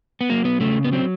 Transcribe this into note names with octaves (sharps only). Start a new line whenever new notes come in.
B3
F#3 A#3
B3
C#3 A3
B3
F#3 C4